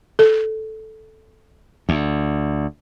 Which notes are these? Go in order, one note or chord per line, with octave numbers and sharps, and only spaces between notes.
A4
D2